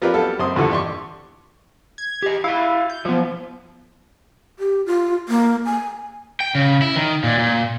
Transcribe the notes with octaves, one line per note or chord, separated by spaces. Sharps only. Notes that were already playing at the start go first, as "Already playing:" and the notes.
F3 F4 G4 A#4 B4 D5
F#3 G3 B3 A4 F5
F#2 C4 C6 D#6
E2 G2 A#2 D3 E3 A4
G4 D5 C6 C#6
G#6
G4 D#5
E4 F#4 F5
G6
F3 F#3 B3
G4
F4
A#3
G#5
G5
C#3
E4
D#3
A#2
A#2